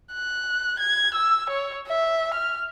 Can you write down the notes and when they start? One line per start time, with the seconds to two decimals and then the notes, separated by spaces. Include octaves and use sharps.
0.13 F#6
0.79 G#6
1.14 E6
1.50 C#5
1.88 E5
2.34 F6